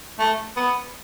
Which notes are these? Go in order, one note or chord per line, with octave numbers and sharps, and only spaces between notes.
A3
B3